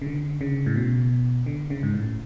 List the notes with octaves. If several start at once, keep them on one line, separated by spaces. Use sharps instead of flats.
C#3
D3
C#3
A2
B2
D3
C#3
G#2
A2